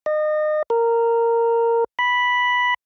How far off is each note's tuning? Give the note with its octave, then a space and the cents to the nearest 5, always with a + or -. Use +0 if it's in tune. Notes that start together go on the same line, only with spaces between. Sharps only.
D#5 -30
A#4 -10
B5 -5